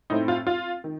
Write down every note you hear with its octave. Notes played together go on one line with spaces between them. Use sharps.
A2 A3 C4 D#4
F4
F4
D#3